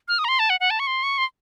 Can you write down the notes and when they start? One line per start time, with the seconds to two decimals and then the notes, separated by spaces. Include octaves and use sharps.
0.08 F6
0.19 D#6
0.24 A#5
0.28 C6
0.39 A5
0.50 F#5
0.60 F#5
0.70 A5
0.79 C#6
0.87 C6
1.03 C#6
1.18 C6